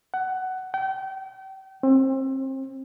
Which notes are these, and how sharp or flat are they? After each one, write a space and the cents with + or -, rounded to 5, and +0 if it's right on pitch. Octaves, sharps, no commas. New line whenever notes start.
F#5 +15
G5 -35
C4 +30